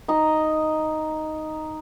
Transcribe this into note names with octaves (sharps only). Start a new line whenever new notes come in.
D#4 D#5 A#5